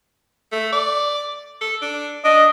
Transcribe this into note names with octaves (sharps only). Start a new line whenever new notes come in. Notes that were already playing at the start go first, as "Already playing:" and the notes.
A3
D5
A4
D4
D4 D#5